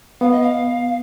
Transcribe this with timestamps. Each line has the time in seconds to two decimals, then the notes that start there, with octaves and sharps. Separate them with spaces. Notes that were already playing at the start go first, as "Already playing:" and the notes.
0.21 B3 F5
0.31 D#5
0.42 F5